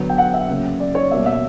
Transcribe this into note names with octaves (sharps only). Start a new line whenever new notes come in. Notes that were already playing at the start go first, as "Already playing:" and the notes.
Already playing: D3 F#3 B3
G5
F#5
E5
C#3 F#3 A#3
D5
C#5
B2 G3 A#3 E5
E5